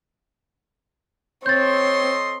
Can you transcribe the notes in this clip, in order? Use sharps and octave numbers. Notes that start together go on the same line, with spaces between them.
C4 A4 C#5 D#5 C6 G6 A6